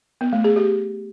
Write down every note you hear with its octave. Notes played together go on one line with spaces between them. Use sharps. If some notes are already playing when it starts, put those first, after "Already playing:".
B3
A3
G#4
G4